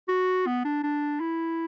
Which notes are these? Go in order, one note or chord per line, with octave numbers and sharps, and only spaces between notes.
F#4
B3
D4
D4
E4